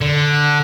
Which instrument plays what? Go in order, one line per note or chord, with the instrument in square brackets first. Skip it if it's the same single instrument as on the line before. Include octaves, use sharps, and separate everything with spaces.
[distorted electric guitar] D3